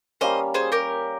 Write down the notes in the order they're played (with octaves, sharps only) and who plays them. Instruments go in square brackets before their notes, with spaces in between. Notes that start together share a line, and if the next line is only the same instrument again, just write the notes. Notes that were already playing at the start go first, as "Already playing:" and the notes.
[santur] G3 A#3 C#4 [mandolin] C5 D#5
[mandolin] G#4 C5
G4 A#4